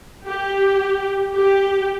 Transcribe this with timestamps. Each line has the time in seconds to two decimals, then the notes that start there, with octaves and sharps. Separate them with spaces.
0.27 G4
1.35 G4